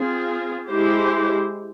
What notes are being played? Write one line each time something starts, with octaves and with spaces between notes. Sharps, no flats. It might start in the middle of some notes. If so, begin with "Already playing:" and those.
Already playing: C4 F4 G#4
G#3 E4 G4 C5